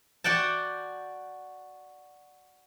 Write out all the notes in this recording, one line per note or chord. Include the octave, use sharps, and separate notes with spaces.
F#4 D5 F#5 G5 A5